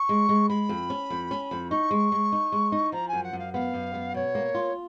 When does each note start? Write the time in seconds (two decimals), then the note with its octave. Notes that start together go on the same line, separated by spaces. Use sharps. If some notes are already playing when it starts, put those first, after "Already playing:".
Already playing: C#6
0.09 G#3
0.29 G#3
0.49 G#3 B5
0.69 F2
0.90 C#4
1.10 F2
1.31 C#4
1.51 F2
1.70 D#4 C#6
1.91 G#3
2.12 G#3
2.32 D#4
2.52 G#3
2.72 D#4
2.92 F3 A#5
3.08 G#5
3.13 F#2
3.23 F#5
3.33 F#2
3.38 F5
3.53 B3 F5
3.74 F#2
3.94 B3
4.14 B2 C#5
4.35 A#3
4.55 F4